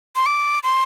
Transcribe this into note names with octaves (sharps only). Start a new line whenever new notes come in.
C6
D6
C6